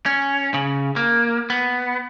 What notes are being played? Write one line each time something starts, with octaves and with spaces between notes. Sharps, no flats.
C#4
C#3
A#3
B3